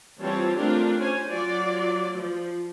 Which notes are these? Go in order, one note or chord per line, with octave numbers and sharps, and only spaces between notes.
E3 G3 C4 F4 C#5 A5
A3 C4 D4 F4 G4 A#4
C#4 C5 C#5 G#5
F#3 F4 D5
F3